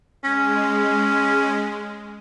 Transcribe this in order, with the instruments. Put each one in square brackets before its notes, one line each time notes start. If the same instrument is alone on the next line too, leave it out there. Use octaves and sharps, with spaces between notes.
[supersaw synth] G#3 [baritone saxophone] C#4